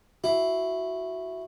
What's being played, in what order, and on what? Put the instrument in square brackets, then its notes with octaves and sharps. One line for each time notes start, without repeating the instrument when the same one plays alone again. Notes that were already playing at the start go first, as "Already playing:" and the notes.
[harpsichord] E4 [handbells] F#4